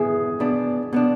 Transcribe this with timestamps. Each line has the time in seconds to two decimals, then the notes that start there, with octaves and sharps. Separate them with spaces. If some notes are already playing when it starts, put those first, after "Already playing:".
Already playing: B2 B3 E4 G#4
0.40 B2 B3 D4
0.93 B2 B3 D4